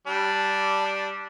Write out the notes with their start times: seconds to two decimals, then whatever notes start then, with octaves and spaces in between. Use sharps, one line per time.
0.07 G3 D4